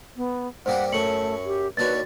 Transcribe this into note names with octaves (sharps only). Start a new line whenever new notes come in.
B3
G2 A#3 G4 C5 F#5
F#2 A3 C#5 C#7 F#7
G4
D#2 D4 F#4 B4 C#5 A6